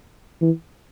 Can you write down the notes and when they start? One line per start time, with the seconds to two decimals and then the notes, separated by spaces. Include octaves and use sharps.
0.41 E3